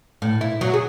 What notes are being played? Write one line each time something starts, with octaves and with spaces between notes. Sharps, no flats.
A2
E4
F#3
G#4